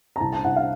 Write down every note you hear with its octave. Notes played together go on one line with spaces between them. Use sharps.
A#5
C2 A5
A5
C2 F#5
F5